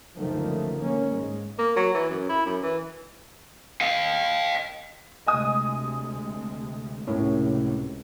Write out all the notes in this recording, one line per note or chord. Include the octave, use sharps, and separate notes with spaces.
C#2 F#2 D3 D#3 F3 A3
A#3 C#4
G#2 G#3
A#3
F#3
E3
F#2
E4
F#2
E3
D#5 F5
D2 C3 G#3 D#5 G#5 D#6
C#2 A2 C3 C#4 A#4